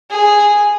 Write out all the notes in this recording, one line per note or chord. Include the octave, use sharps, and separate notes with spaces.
G#4